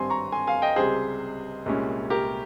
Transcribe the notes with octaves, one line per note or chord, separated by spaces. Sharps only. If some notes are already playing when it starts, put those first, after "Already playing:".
Already playing: G#1 G2 G3 C4 G#5 C6
A#5 C#6
G#5 C6
F5 G#5
D#5 G5
C#2 C3 G3 G#4 C5
C2 A#2 G#3 C#4
G4 A#4